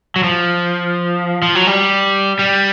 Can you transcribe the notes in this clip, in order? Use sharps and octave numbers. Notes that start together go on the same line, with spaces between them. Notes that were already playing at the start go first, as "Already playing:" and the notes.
F#3
F3
F3
F#3
G3
G3